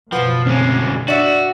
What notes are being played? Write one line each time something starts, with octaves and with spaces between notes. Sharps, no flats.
F#1 B2 F3 B4 F#5 B5
D2 G#3 C4 C#4
D4 F#4 D5 E5